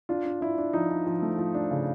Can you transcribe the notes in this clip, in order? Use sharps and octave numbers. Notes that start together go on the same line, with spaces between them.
D4 F4
D4
D4 E4
D4
F3 D#4
D4
F3
A3
F3
D4
C#3